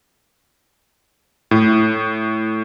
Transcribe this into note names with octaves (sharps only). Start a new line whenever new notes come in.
A2